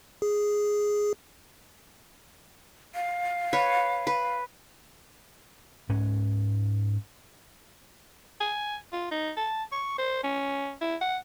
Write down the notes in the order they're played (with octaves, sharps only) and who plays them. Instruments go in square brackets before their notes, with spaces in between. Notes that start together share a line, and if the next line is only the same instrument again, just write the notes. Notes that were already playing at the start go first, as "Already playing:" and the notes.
[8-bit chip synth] G#4
[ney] F5
[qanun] B4 C#5
B4
[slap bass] G#2 C#4
[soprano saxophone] G#5
F4
D#4
A5
C#6
C5
C#4
E4
F#5